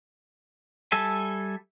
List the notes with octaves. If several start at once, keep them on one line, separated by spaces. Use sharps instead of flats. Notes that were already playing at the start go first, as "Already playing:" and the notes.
G3 A4 E5 G#5 A5